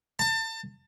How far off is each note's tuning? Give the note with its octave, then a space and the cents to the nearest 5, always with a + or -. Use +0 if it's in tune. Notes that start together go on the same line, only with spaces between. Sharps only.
A5 +30